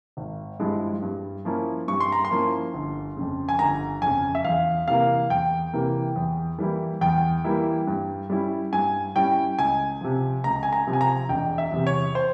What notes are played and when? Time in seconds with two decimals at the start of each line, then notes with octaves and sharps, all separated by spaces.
0.17 G#1
0.60 G2 F3 G#3 E4
1.02 G2
1.45 F3 A#3 C#4 E4
1.88 G2 C#6
2.00 C6
2.12 A#5
2.25 C6
2.31 F3 A#3 C#4 E4
2.74 G1
3.17 F2 C#3
3.49 G#5
3.59 G1 A#5
4.02 F2 C#3 G#5
4.35 E5
4.45 E2 F5
4.88 C3 E3 A#3 F5
5.30 E2 G5
5.73 C3 E3 A#3
6.16 E2
6.58 E3 G3 A#3 E4
7.01 E2 G5
7.44 E3 G3 A#3 E4
7.87 G2
8.30 G3 C#4 E4
8.73 G2 G#5
9.16 G3 C#4 E4 G5
9.58 C#2 G#5
10.01 C3 F3
10.44 C#2 A#5
10.63 G#5
10.73 A#5
10.87 C3 F3
10.93 G#5
11.01 A#5
11.29 E1 G5
11.58 E5
11.72 E2 C3
11.87 C#5
12.15 C5